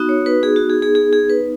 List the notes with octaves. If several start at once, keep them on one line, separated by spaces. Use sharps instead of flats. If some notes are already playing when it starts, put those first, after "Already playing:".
Already playing: B3 D#4 F#4
C#5
B4
G#4
F#4
G#4
G#4
G#4
G#4
B4